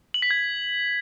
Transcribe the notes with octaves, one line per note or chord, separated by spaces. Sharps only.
F#7
B6
G#6